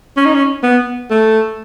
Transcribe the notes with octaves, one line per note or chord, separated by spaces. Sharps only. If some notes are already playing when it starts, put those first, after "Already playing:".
C#4
D#4
C#4
B3
A3